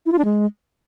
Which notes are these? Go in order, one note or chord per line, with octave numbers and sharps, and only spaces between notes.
E4
F4
D4
G#3